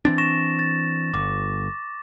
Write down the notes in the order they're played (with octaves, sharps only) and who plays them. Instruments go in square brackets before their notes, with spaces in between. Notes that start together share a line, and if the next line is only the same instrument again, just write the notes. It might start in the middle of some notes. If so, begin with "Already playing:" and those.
[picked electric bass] E3 C4 D4 [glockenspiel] A6
[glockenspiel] C#6 A#6 E7
A6
[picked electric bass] G1 [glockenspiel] D6